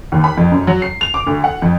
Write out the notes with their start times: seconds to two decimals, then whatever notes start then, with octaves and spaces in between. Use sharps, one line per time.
0.12 D#2
0.24 B5
0.37 F2
0.52 F#2
0.67 F#3
0.82 C7
1.01 F7
1.14 D6
1.27 D2
1.44 F#5
1.62 F2